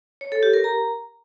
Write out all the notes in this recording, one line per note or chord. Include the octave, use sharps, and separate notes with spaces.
C#5
A4
G4
A#4
A#5